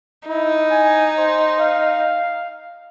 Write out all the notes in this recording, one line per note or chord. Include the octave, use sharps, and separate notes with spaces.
D#4 E4
G#5
C5
F5